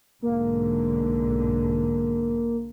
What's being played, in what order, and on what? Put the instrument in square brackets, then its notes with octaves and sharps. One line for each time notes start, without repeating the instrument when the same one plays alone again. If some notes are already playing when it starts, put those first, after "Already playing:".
[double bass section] B1 G#2 D3 [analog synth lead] A#3